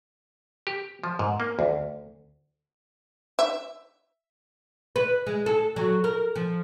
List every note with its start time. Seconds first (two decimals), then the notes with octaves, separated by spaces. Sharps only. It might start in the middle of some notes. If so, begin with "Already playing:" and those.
0.67 G4
1.04 F3
1.19 G#2
1.40 A#3
1.59 D2
3.39 E5
4.96 B4
5.27 G#3
5.46 A4
5.76 F#3
6.04 A#4
6.35 F3